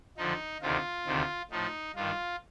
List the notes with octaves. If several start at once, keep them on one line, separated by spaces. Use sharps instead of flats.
F2 D3 F3 D#4
D2 C3 D#3 F4
D2 C3 D#3
A2 F3 D#4
G2 D#3 F4